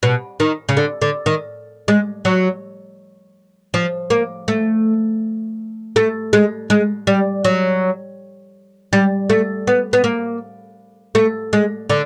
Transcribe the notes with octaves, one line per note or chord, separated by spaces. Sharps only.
B2
D#3
C#3
D3
D3
D#3
G#3
F#3
F3
A#3
A3
A3
G#3
G#3
G3
F#3
G3
A3
B3
B3
A#3
A3
G#3
D3